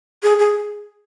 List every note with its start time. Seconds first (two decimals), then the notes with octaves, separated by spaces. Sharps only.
0.23 G#4
0.39 G#4